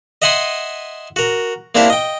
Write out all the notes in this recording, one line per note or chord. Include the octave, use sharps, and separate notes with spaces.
D#5 E5 F#5 G#5 C6 D#6
F#4 A#4
A#3 C4 D4 E4 G4 A#4
D#5 G5